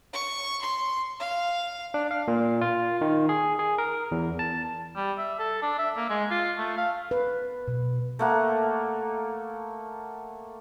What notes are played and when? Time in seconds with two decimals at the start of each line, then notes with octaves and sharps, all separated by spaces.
0.13 C#6
0.61 C6
1.20 F5
1.94 D4
2.11 F5
2.28 A#2
2.61 F4
3.01 D#3
3.29 G#4
3.59 G#4
3.78 A#4
4.11 E2
4.39 A5
4.96 G3
5.18 E5
5.40 A4
5.62 D4
5.79 E5
5.97 A#3
6.10 G#3
6.31 F4
6.58 A3
6.78 F5
7.11 B4
7.68 B2
8.19 A3 A#3 F#5